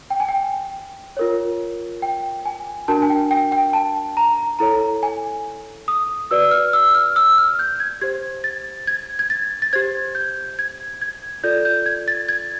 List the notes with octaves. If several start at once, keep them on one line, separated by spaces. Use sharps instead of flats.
G5
G#5
G5
F4 A#4 C#5
G5
G#5
D4 F#4 A#4 A5
G#5
G5
G5
G5
A5
A#5
E4 A4 C#5 A#5
G#5
D#6
F#4 B4 D5 E6
F6
E6
F6
E6
F6
G6
G#6
G4 C5 G#6
A6
G#6
G#6
A6
A6
G4 C5 G#6
G6
G#6
G#6
F4 A4 D5 G6
G6
G#6
A6
G#6